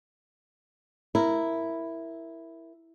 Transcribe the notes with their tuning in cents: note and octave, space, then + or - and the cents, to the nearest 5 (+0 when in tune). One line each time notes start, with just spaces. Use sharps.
E4 +0 A#4 +0